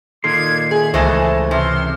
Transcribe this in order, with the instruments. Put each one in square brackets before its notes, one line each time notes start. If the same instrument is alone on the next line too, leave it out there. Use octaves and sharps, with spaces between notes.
[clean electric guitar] A#2 D#3 C6 [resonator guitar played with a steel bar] A4 [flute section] D6 F#6 G#6
[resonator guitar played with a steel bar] G#4 [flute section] E5 G#6
[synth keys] C#2 C#3 C5 [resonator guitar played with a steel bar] E3 G#3 A3 [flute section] A4 A5
[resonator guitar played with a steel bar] C3 [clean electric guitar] E3 [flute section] C6 F6 F#6